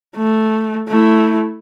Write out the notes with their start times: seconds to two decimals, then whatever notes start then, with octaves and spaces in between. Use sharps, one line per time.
0.17 A3
0.88 A3 E4